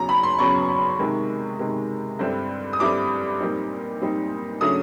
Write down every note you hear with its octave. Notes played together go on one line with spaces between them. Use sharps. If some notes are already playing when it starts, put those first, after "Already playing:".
Already playing: E2 C#3 F#3 A#5
B5
C6
E2 C#3 F#3 C#6
C3 D#3 G#3
C3 D#3 G#3
G2 D3 G3 C4 E4
D#6
G2 D3 G3 C4 E4 D6
A#2 G3 C4 D#4
A#2 G3 C4 D#4
C#3 F#3 A3 D4 D#6